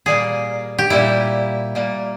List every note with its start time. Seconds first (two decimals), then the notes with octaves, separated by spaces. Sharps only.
0.06 A#2 G3 A#3 G#4
0.78 G4
0.90 A#2 G3 A#3 E4
1.75 A#2 G3 A#3